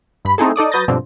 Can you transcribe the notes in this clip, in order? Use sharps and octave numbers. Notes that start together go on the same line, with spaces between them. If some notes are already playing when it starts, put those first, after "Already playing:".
G2 B5
A3 C4 D#4 E4 G#4 A4
D#4 A4 D5 D#6
F#3 B4 D#6 G6 A6 A#6
G2 B2 D3 F3 C4